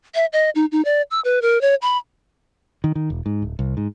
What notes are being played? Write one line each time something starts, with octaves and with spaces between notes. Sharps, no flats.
E5
D#5
D#4
D#4
D5
E6
B4
A#4
C#5
B5
D#3
D#3
E1
G#2
D1
C2
G#2